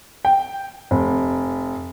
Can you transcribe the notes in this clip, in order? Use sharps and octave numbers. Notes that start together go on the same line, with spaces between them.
G5
F1